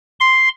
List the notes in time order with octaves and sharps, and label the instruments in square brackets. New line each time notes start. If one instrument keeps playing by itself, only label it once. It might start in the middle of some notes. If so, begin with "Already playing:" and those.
[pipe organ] C6